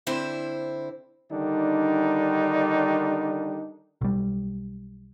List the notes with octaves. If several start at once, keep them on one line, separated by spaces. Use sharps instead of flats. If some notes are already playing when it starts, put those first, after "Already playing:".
D3 C4 D4 E4 C5
D3 D#3 G3 D4 D#4
B1 G3